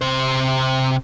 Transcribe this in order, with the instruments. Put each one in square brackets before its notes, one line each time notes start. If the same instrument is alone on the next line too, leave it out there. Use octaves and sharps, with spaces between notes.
[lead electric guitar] C3 C5